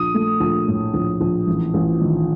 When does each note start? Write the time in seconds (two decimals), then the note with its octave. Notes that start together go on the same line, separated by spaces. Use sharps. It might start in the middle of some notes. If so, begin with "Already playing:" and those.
Already playing: A#1 D#6
0.14 A3
0.40 A#1
0.68 A2
0.94 A#1
1.21 A#1
1.47 A1
1.74 A1
2.01 D#3